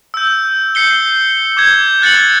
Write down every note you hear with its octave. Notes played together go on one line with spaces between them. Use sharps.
E6 G6
G6 C7 C#7 G7
D6 G6 G#6
F#6 A6 C#7 F#7